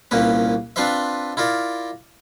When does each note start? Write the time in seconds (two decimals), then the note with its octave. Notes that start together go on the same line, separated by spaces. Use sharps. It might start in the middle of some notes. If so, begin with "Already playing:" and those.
0.11 C2 A#2 A#3 C#4 B4
0.76 C4 D4 F4 B4 C5 E5
1.37 E4 F4 A#4 D5